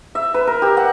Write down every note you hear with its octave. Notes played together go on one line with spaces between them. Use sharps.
E5
B4
A#4
G4
F#5